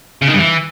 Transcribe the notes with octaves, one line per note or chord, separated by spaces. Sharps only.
C#3
D#3
G2
E3